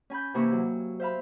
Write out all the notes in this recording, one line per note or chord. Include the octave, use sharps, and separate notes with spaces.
C#4 G#5 B5 G6
C3 E3 A#3 C#6 E6
F#3
C5 E5 F5 B5